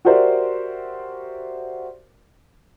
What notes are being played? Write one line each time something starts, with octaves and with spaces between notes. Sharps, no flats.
F#4 G4 A#4 C5 D5 E5